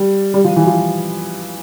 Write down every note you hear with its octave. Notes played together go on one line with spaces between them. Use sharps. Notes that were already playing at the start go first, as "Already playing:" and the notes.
Already playing: G3
G3
F3
E3
F3